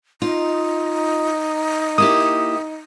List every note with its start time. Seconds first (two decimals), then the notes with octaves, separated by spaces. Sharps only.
0.22 D#4 F4
1.98 A#3 E4 G4 D#6